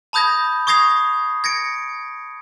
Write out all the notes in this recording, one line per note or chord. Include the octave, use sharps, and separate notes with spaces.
A5 B5 D#6 G6 G#6 A#6
C#6 D#6 G#6 A#6 C7 F7
G#6 A#6 C#7 D7